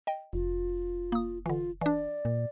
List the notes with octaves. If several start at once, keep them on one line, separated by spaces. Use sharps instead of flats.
D#5 G5
F1 F4
A#3 D#6
D3 E3 F4
E3 D4 D5
A#2